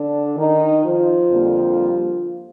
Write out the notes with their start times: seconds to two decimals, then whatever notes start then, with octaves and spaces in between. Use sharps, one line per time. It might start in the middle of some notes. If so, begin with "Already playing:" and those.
Already playing: D3 D4
0.37 D#3 D#4
0.83 F3 F4
1.31 F2 D3 G3 A#3